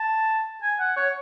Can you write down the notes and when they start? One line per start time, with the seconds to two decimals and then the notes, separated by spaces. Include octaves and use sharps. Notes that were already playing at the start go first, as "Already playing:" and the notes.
Already playing: A5
0.63 G#5
0.80 F#5
0.97 C#5